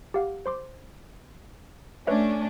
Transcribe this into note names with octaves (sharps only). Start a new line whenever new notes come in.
G4 F5 F#5
C5 C6 D6
A3 C#4 D4 B4 C#5 E5